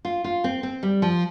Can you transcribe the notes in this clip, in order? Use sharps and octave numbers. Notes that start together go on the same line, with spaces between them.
F4
F4
C4
C4
G3
F3